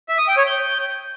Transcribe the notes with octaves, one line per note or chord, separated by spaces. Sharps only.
E5
D#6
G5
C#5
G6